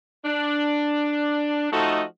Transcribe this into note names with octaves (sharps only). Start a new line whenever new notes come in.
D4
F3 A3 D#4 F#4 A4 D#5